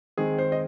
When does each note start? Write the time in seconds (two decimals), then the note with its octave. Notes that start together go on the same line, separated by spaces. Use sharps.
0.18 D#3 G#3 C4 G#4
0.38 C5
0.52 D#5